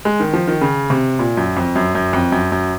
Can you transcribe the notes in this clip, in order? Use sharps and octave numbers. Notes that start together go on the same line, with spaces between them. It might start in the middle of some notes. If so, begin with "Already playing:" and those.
G#3
D#3
F3
D#3
C#3
C3
A#2
F#2
F2
F#2
F#2
F2
F#2
F#2